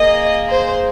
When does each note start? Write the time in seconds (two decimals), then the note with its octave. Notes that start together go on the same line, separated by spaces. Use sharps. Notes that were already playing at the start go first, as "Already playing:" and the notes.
Already playing: A#3 G#4 D#5
0.49 C5